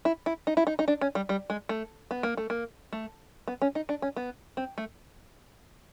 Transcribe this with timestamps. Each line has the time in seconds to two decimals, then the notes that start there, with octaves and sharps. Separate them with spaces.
0.05 E4
0.26 E4
0.47 D#4
0.57 E4
0.67 D#4
0.79 D#4
0.88 D4
1.01 C#4
1.15 G3
1.29 G3
1.50 G#3
1.69 A3
2.11 B3
2.23 A#3
2.37 A3
2.50 A#3
2.93 A3
3.48 B3
3.62 C#4
3.75 D#4
3.89 D4
4.02 C#4
4.16 B3
4.57 C4
4.78 A3